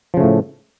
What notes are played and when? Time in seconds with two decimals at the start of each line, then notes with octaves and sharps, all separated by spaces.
0.14 F3
0.17 C#3
0.20 A3
0.23 A2